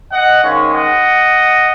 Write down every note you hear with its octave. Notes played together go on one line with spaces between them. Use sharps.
D#5 F#5
G#2 D#3 G#3 C#4 C#5 F5
D#5 F#5